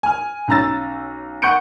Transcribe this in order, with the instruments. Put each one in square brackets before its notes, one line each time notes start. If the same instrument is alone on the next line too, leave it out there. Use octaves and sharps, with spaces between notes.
[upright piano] G#5 F6
B1 C#4 A#5 E6 A6
F#5 C#6 F#6 G6 C#7 D7